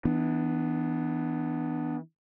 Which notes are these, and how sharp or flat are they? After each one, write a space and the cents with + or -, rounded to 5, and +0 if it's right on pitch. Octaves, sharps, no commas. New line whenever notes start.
E3 -20 B3 +10 D4 +20